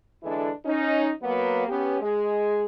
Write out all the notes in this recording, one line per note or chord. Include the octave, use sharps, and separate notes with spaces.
D3 E3 G#3 D4 E4 A4
C#4 D#4
F#3 A#3 B3
B3 C#4 G4
G#3 G#4